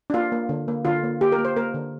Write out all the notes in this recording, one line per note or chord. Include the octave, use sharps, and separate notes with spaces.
D4
A#3 F4
A#3
D3
A#3
D3 F4
A#3
A#3 G4
A#4
A#3
C5
A#3 A#4
D3